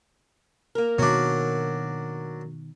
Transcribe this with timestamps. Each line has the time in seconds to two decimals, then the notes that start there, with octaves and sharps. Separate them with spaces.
0.75 A#3 A#4
0.99 B2 D#3 F#3 D4